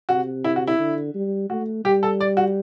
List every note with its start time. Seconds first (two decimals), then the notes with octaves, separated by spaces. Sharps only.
0.09 C3 F#4
0.44 E4
0.56 F#4
0.67 E4
0.79 D3
1.15 G3
1.50 A3 F#4
1.85 G3 G4
2.03 A4
2.20 D5
2.37 F#4